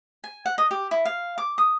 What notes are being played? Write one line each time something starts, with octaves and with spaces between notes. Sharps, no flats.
G#5
F#5
D#5
G4
E4
F5
D6
D#6